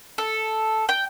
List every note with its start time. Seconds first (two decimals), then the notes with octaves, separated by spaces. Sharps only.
0.18 A4
0.89 G5